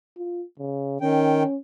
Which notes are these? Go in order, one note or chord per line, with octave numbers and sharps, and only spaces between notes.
F4
C#3
D#3 C#4 G5